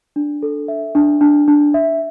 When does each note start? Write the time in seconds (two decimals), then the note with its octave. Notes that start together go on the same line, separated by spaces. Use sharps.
0.16 D4
0.43 A4
0.68 E5
0.95 D4
1.21 D4
1.48 D4
1.74 E5